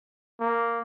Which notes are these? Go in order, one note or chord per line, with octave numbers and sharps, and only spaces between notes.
A#3